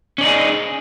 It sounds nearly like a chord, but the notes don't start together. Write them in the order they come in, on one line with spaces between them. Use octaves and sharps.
C#4 D5 D#4 G#4